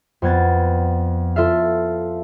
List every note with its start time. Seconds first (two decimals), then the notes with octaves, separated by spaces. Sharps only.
0.22 F2 B3 G#6 A6
1.36 F4 A4 E5 F5